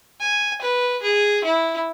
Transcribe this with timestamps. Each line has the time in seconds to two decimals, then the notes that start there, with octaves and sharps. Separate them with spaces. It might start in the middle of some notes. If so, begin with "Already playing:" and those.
0.20 G#5
0.61 B4
1.02 G#4
1.44 E4